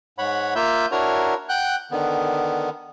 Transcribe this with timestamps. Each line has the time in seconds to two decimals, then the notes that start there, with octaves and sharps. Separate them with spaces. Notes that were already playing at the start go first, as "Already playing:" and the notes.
0.18 G#2 C#5 F#5 B5
0.56 A#3 F4 E5 G6
0.92 D4 E4 F#4 A#4 C#5 A#5
1.49 F#5 G5 F#6 G6
1.91 D3 D#3 B3